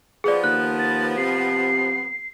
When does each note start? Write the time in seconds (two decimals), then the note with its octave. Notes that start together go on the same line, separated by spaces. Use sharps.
0.24 F3 B3 G#4 D5
0.44 D#2 F#6
0.79 A6
1.17 C3 C7